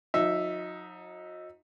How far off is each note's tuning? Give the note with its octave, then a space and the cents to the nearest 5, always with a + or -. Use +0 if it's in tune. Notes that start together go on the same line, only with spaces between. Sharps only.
F#3 -40 D#4 +10 E5 +0